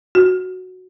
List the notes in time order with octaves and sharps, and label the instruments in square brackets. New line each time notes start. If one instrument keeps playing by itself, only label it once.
[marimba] F#4